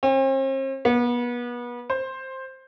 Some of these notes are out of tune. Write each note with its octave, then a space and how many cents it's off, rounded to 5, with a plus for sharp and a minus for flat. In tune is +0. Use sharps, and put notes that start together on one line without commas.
C4 +45
B3 -35
C5 +10